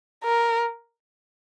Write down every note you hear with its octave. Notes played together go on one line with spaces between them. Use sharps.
A#4